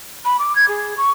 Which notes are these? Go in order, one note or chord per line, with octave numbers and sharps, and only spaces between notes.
B5
D6
G#6
G#4
C#6